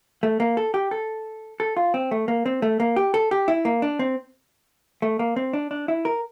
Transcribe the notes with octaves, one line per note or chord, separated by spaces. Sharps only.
A3
A#3
A4
G4
A4
A4
F4
C4
A3
A#3
C4
A3
A#3
G4
A4
G4
E4
A#3
D4
C4
A3
A#3
C4
D4
D4
E4
A#4